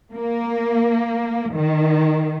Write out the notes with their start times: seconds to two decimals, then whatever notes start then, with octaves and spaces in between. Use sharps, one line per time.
0.14 A#3
1.53 D#3